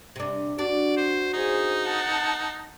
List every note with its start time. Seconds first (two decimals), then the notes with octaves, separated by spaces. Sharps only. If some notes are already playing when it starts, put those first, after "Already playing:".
0.16 C3 D4
0.59 D4 F#4 D5
0.97 C5
1.33 D#4 G#4 C5
1.85 F#5 A5